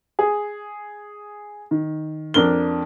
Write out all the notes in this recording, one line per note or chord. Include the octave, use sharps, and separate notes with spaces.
G#4
D#3
F2 D4 A#4 G7